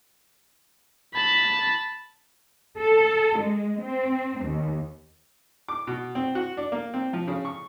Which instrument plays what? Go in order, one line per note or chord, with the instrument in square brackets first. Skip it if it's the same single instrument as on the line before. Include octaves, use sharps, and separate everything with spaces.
[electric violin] A5 B5
[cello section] A4
G#3
C4
D#2
[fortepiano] D6
B2
C4
F#4
D4
A#3
C4
F3
C#3
C#6